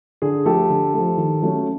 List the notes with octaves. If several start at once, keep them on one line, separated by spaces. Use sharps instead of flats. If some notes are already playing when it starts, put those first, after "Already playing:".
D3 G#4
F3 A3 G4 A4
D3
F3 A3
D#3
F#3 A3 C#4